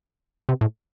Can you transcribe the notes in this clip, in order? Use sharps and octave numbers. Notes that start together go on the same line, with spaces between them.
C3
A2